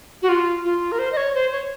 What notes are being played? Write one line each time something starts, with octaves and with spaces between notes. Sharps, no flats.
F#4
F4
F4
A#4
C5
D#5
C#5
C5
C#5